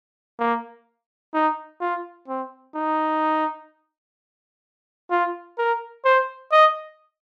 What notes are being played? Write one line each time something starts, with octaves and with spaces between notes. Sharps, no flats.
A#3
D#4
F4
C4
D#4
F4
A#4
C5
D#5